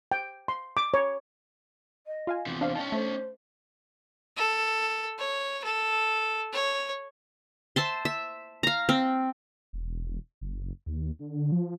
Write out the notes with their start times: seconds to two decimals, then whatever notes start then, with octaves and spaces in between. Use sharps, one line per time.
0.12 G5
0.48 C6
0.77 D6
0.94 C#5
2.06 D#5
2.27 F4 F5 G#5
2.47 E2 C3
2.61 D4 C5 F5
2.75 C#4 D#4 G5 A5
2.92 A3 C5
4.37 A4
5.18 C#5
5.64 A4
6.53 C#5
7.76 C5 E5 A5 C6
8.05 E5
8.63 F5 A#5
8.89 C4
9.73 E1
10.41 F#1
10.86 D#2
11.19 D3
11.52 F3